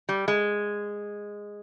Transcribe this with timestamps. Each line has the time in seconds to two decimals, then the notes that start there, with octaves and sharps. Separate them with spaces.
0.09 G3
0.28 G#3